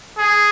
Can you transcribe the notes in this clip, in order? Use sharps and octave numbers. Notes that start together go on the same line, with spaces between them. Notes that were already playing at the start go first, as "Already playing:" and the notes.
G#4